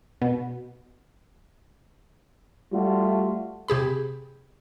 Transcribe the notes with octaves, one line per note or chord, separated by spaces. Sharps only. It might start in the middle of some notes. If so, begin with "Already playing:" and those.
B2
G3 A3 F4 F#4
C3 G4 G#4 B5